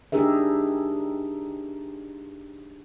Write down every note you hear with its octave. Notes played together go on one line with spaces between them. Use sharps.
D4 D#4 G4 G#4 A#4 E5